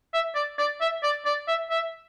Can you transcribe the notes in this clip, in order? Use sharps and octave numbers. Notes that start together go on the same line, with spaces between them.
E5
D5
D5
E5
D5
D5
E5
E5